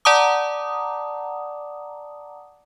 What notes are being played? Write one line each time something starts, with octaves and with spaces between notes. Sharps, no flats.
D5 F#5 A5 A#5 D6 D#6